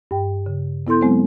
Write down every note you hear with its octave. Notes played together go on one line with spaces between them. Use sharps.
G2 G5
C#3
B3 E4 A4 C6 G6
F#3 G#3 B3 C4 C5